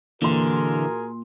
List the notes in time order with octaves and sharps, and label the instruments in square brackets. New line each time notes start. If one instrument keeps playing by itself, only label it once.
[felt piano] A#2 C6 [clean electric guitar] D3 [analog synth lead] E3 [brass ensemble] F#4 G#4 A#4